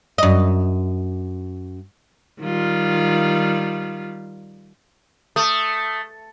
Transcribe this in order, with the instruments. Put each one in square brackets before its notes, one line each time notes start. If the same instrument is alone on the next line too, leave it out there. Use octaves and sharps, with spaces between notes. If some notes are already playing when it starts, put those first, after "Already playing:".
[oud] F#2 D#5
[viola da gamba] D#3 G3 F4
[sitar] A3 [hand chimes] D#6